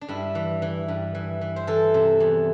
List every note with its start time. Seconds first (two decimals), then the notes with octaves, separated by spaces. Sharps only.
0.01 D4
0.08 G2 E4
0.35 E3
0.62 E3
0.88 G2
1.15 E3
1.41 E3
1.56 C5
1.67 E3 A4
1.94 C3
2.20 E2